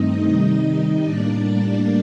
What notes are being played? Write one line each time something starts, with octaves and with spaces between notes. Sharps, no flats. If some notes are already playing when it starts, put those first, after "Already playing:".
Already playing: G2 D#3 A3 C4 D#4 D#5
C3 D#3 G3 D#4 D#5
A2 G3 A#3 D4 D5